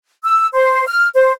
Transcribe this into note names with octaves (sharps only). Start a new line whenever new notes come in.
E6
C5
F6
C5